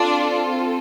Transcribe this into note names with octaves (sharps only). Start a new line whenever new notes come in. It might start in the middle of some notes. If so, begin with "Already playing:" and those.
Already playing: C4 D4 F4 A4 D5